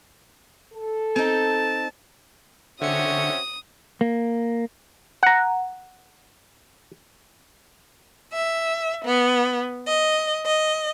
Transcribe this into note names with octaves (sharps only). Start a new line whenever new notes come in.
A4
C4 D#4 A5
D3 C4 C#4 F#4 E5 D#6 C#7
A#3
F#5 A#5
E5
B3
D#5
D#5